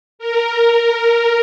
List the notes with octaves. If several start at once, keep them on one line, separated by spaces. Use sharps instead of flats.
A#4